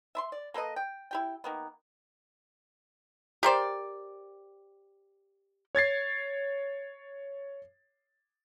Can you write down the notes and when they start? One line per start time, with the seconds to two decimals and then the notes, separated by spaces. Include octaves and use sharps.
0.15 E5 B5 C6
0.32 D5
0.54 A#3 A4 B4 D#5
0.76 G5
1.11 E4 G4 G5
1.44 D#3 A#3 B3
3.43 G4 A#4 C5 D5
5.75 C#5 G#6 A6 C7